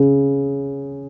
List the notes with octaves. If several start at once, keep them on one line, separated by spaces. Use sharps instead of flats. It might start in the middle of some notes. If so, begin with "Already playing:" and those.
Already playing: C#3